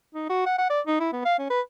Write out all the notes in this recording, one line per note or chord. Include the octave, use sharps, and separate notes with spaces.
D#4
F#4
F#5
F#5
D5
D#4
E4
B3
F5
C#4
B4